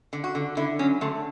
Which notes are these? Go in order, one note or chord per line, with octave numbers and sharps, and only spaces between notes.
D3
F#4
D3
D3 E4
F#3 C#4
D3 A3